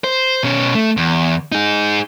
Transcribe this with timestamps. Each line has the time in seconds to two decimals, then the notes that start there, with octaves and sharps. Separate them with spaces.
0.04 C5
0.43 B2 C#4
0.75 A3
0.97 E2
1.52 D#4 G#4